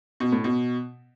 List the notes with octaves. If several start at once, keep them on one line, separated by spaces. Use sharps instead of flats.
B2
A2
B2